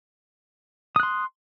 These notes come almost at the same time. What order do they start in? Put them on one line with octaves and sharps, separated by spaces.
D#6 F#6 C6